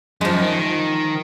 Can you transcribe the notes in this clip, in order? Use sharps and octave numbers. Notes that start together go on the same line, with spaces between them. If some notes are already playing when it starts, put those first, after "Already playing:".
F#2 F3 G#3
D#3